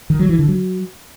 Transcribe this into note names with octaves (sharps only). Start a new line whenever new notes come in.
D#3
F#3
E3
D3
F#3